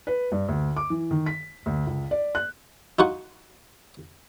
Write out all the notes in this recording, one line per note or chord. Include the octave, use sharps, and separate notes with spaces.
B4
G2
D2
D6
E3
D#3
B6
D2
C#2
D5
F#6
D#4 F4 F#4 F#5